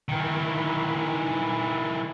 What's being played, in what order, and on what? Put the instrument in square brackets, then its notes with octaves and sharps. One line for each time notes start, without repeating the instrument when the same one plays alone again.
[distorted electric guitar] D#3 E3